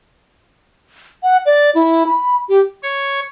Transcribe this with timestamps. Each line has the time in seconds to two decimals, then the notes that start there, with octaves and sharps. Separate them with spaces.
1.23 F#5
1.46 D5
1.75 E4
2.07 B5
2.49 G4
2.83 C#5